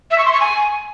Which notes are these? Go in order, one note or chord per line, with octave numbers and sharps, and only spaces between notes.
E5
C#6
C6
C#6
G#5